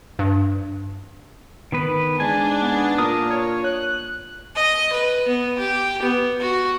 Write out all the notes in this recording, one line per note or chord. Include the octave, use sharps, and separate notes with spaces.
G2
D#3 B3 B4
G#2 D4 G#5
B3
A#2 A#4 D#6
C#5
F#6
D#5
B4
B3
G4
B3
F#4